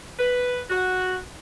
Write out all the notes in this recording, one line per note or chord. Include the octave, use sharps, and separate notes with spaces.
B4
F#4